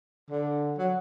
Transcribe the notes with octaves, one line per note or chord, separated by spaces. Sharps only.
D3
F#3